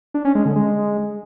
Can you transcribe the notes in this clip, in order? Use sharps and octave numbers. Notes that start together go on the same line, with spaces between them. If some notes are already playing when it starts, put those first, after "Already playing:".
D4
C#4
G#3
D3
G#3